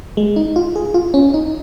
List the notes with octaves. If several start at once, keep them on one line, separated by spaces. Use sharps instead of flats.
G#3
D#4
F4
G#4
F4
C#4
D#4